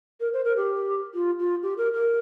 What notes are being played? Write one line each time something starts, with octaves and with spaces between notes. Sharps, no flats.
A#4
C5
A#4
G4
F4
F4
G4
A#4
A#4